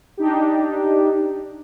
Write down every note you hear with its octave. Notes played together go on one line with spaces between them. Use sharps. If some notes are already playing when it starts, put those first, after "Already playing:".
D4 D#4 G4